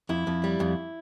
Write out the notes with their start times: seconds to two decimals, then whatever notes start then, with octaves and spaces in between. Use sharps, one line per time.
0.09 F2 E4
0.27 F2
0.44 G3
0.60 F2